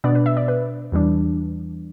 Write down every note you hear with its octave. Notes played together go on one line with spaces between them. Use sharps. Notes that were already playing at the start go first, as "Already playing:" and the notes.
B2 B3 D4 D5
B4
E5
D5
B4
E2 E3 G3 D4